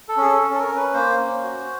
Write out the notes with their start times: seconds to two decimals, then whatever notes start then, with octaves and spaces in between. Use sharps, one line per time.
0.09 A4
0.17 C#4 G#4
0.25 A4
0.42 C#4
0.54 A4
0.59 A#4
0.67 C#4
0.76 B4
0.93 A#3 C5
1.19 C#4
1.44 F#4